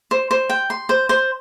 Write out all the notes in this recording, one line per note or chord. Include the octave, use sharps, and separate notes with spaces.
C5
C5
G5
C6
C5
C5